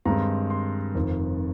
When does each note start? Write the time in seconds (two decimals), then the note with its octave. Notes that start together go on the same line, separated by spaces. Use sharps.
0.05 G2 D#3 G#3 C4 D#4 A#5
0.50 C6
0.95 F1 F2 D#3